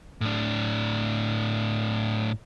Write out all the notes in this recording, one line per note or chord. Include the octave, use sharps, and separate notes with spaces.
A2 D4